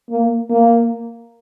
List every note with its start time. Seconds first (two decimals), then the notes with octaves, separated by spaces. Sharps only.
0.10 A#3
0.50 A#3